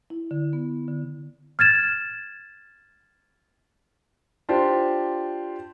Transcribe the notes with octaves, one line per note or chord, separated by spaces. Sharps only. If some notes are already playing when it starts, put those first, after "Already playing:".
E4
D3
B3
D3
F6 G#6 A6 E7
D4 F4 G4 C5